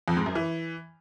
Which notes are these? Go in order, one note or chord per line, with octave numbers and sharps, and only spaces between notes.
F2
G#2
F#2
E3